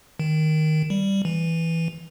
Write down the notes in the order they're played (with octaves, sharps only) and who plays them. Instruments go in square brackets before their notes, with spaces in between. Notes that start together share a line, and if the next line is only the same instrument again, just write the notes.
[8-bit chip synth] D#3
G3
E3